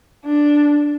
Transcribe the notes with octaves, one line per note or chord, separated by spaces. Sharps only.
D4